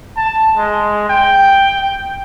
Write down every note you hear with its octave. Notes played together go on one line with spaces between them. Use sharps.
A5
G#3
G5